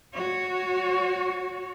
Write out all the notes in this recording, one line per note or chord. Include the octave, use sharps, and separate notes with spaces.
F#4 C#5